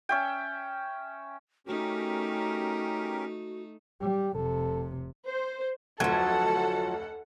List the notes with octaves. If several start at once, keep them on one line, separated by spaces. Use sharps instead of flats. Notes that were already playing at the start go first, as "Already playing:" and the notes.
C#4 E5 G5
A3 C#4 D#4 F#4 G4 A#4
G3 G4
F1 C3 A4
C5
F1 D2 F3 F#3 A4 F#5 A5 G#6